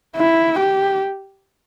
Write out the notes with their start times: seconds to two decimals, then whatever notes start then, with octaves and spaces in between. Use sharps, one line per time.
0.17 E4
0.60 G4